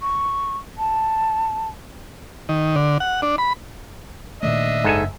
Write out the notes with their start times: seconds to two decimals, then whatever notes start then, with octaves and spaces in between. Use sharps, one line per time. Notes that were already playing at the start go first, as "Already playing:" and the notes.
0.01 C#6
0.78 A5
2.49 D#3
2.76 D3
3.00 F#5
3.22 D4
3.38 B5
4.43 A#2 D#3 A3 D4 D#5 E5
4.84 F#1 G#2 A4 G#5